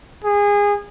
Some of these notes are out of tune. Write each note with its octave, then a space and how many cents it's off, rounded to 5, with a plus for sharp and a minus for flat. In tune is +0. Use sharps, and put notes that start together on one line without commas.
G#4 -25